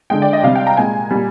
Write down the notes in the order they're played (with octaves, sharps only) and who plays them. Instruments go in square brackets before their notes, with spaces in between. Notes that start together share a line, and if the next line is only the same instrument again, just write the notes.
[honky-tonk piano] D3 G#3 G5
D5
D#5
C3 G3 F5
G5
A#5
A#2 G#3 G#5
A#2 G3